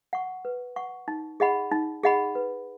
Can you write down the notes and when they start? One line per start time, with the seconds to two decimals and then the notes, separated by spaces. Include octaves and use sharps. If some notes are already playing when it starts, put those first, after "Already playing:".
0.13 F#5 C#6
0.45 B4
0.76 F#5 C#6
1.08 D#4
1.40 G#4 D#5 F#5 B5
1.72 D#4
2.04 G#4 D#5 F#5 B5
2.35 B4